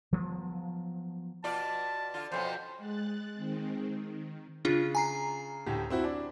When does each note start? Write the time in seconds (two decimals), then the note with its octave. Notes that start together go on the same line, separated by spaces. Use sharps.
0.13 F3 F#3 B3
1.44 B2 F4 D5 A5
2.14 D3 F4
2.32 F2 B2 C#4 C5
2.78 G#3 F#6 A6
3.34 D#3 G#3 C4
3.93 D#3
4.65 C#3 C#4 D4 F4
4.95 G#5 A#5 C7
5.66 D2 A2 G4
5.90 C4 E4 F#4
6.04 D4